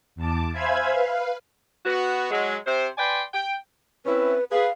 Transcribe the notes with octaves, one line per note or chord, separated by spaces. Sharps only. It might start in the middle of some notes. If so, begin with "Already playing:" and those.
E2 A5 D6
C5 E5 F5 G#5 B5 G#6
B4 F5
B3 F#4
F#3 G#3
C3 C5
B4 D5 G5 G#5 C6
G5
C4 C#4 E4 B4
G#4 B4 F5